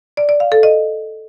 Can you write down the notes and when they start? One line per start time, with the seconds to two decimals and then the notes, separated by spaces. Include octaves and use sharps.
0.17 D5
0.29 D5
0.40 F5
0.52 A4
0.63 D#5